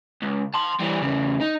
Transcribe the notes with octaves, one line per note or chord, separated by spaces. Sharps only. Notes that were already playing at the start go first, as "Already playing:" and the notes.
C#2
A5 C6
E3 G3
E2 C#3
D#4